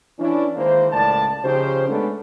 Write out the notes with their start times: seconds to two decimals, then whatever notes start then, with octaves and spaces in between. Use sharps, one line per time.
0.19 E3 C#4 D4 E4
0.56 D#3 E3 G#3 A#3 C5
0.92 C#2 A2 A#3 D5 A5
1.43 C#3 F3 C#4 D#4 G4 C5
1.89 G#3 A3 B3 C#4 D4 A4